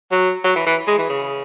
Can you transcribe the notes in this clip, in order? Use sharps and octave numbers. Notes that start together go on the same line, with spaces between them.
F#3
F#3
E3
E3
G#3
E3
C#3